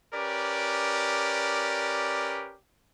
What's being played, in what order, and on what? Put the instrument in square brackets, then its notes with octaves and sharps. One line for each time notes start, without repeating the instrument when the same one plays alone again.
[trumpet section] C#4 G4 A#4 B4 D5